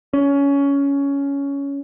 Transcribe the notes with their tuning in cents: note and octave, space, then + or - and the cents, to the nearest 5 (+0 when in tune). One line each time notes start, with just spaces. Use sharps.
C#4 +15